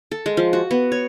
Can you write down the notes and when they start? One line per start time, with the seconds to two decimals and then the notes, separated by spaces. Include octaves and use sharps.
0.11 A4
0.26 G#3
0.37 F3
0.53 F#4
0.71 B3
0.92 C#5